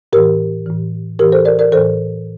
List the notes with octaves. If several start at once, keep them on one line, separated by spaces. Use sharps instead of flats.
A2 E3 G4 A#4
A2 E3
A2 E3 G4 A#4
A4 C5
A#4 D5
A#4 D5
A2 E3 A4 C5